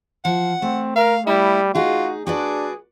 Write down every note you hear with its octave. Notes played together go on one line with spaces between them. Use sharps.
F3 F#5
A3 C4
A#4 F5
G3 E4
D#4 F4 F#4 G#4
D4 F#4 G#4 B4 D5